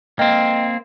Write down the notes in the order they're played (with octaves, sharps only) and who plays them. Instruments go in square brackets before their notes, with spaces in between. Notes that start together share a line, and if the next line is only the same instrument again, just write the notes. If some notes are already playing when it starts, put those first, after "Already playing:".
[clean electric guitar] A#3 C4 [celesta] D#5 G5